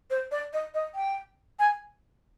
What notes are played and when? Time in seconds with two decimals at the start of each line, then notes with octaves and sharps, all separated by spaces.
0.10 C5
0.32 D5
0.53 D#5
0.74 D#5
0.95 G5
1.59 G#5